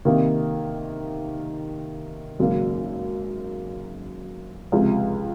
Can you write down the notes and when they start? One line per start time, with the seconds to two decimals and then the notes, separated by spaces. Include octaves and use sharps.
0.05 C3 D#3 A#3 D#4
2.39 G#1 F#2 C#3 F#3 A#3
4.72 C#2 C3 F3 G#3